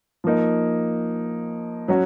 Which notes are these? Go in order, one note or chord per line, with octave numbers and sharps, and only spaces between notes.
F3 A#3 D#4
F#3 C#4 F#4